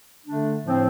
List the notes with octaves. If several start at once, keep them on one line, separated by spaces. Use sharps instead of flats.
D3 A3 D4
A2 F3 C4